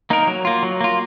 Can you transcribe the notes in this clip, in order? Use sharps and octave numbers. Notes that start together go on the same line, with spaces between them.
A#3 D#4 A#4
F#3
A#3 F4
F#3
A#3 F4